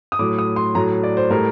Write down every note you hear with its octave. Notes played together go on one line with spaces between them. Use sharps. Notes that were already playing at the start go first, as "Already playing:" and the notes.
D#6
A2 F#3 D6
D#6
C6
A2 F#3 A#5
D5
C5
A2 G3 A#4